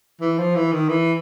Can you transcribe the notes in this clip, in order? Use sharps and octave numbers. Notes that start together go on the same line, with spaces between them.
E3
F3
E3
D#3
E3